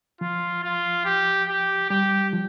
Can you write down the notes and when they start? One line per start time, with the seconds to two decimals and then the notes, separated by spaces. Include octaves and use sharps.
0.21 F3 F4
0.64 F4
1.05 G4
1.48 G4
1.90 G3 G4
2.33 F3